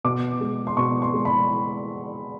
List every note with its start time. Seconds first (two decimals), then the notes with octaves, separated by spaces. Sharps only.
0.04 B2 D6
0.41 G#3
0.67 C6
0.77 B2 C#6
1.02 C6
1.14 G#3
1.25 B5